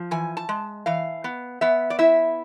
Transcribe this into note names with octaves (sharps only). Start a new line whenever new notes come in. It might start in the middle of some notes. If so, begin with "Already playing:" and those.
Already playing: F3
E3 G#5
A5
G#3
E3 F5
B3
B3 E5
D5
E4 E5